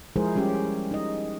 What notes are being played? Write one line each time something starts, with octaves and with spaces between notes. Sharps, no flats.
F3 G#3 E4 G#4 A#4 C5
G3 G#3 C#4 G4
D#4 D#5